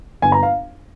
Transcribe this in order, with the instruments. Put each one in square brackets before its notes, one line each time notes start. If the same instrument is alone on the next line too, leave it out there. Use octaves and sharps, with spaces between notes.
[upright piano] G1 G#5
A#5
F5